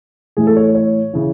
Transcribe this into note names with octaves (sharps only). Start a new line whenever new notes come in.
A2 E3 G#4
A4
C#5
C#5
C#3 E3